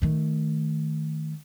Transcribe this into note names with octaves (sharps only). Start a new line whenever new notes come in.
D#3 A3